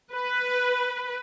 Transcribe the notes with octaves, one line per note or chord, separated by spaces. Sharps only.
B4